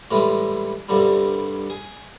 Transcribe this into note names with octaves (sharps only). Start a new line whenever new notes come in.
A2 E3 G3 G#3
C2 G2 D3 G3
G#4